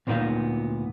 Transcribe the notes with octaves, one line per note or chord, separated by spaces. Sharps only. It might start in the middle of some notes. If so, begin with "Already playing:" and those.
D2 A#2 A#3 B3 D#4 F5